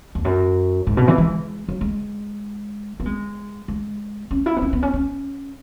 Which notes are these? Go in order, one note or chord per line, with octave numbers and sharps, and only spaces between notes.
E2
F#2
G#2
B2
E3
G#3
F#3
G#3
B3
G#3
G#3
C#4
E4
B3
C#4
B3
C#4
C#4